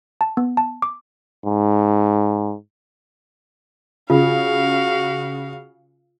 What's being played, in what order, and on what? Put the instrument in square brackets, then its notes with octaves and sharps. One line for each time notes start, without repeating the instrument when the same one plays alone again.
[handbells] A5
B3
A5
D6
[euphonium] G#2
[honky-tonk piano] C#3 [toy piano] F4 [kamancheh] F#4 F5